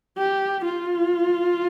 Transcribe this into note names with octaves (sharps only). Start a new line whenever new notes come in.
G4
F4